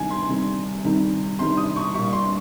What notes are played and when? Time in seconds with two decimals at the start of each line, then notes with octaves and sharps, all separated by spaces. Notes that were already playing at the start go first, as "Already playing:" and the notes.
Already playing: C3 D#3 G3 G#5
0.10 C6
0.28 C3 D#3 G3
0.84 C3 D#3 G3
1.39 C3 D#3 G3 C6
1.57 D#6
1.76 C#6
1.94 A#2 G3 C#6
2.13 C6